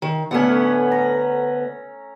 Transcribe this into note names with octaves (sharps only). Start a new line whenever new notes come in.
D#3
D2 A2 B3 C#4 F#5
A#5